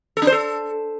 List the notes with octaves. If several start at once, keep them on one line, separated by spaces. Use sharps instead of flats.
A4
D4
C5
A4